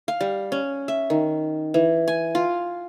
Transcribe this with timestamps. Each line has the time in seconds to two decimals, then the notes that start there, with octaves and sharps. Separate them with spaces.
0.08 F5
0.21 G3
0.52 C#4
0.88 E5
1.10 D#3
1.74 E3
2.08 G#5
2.35 F4